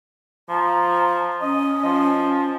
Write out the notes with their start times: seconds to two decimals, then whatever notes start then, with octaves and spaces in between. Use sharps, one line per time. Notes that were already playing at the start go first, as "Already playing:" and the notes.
0.49 F3 A#5
1.42 C#4 D#5
1.84 F3